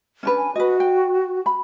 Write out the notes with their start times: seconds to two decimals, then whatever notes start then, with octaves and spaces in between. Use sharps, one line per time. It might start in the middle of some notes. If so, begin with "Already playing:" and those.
0.23 C#4 D4 B4
0.36 G#5
0.56 F#4 B4 D#5
0.80 G5
1.46 B5